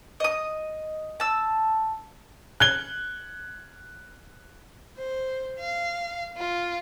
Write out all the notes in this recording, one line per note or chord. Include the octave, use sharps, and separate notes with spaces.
D#5 D#6
A5 E6
F#6 G#6 G7
C5
F5
F4